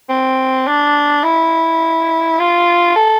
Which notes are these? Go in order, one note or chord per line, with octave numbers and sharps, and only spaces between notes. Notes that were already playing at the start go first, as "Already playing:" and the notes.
C4
D4
E4
F4
A4